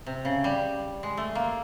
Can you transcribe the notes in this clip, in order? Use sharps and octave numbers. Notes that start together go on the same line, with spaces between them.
C3
C#3
G3
G#3
A3
A#3